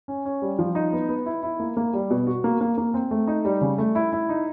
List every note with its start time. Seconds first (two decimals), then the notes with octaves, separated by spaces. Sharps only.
0.08 C#4
0.25 C#4
0.42 G3
0.59 F3
0.75 D#4
0.93 B3
1.09 B3
1.26 E4
1.43 E4
1.60 A#3
1.77 A#3
1.93 G3
2.10 B2
2.27 F#4
2.44 A#3
2.61 A#3
2.78 A#3
2.94 C4
3.11 A3
3.27 D#4
3.45 G3
3.61 C#3
3.78 A3
3.95 E4
4.12 E4
4.29 D#4